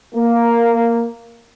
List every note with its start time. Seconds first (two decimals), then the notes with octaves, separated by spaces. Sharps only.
0.15 A#3